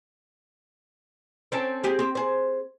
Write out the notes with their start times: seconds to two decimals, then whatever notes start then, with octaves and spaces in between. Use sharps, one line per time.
1.52 C4 C#4 A4
1.83 G#3 G4 G#4
1.99 C4 G4
2.15 G#4 C5